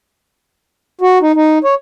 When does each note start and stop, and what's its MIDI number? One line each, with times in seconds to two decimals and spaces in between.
1.01 1.18 66
1.22 1.32 63
1.35 1.59 63
1.64 1.75 73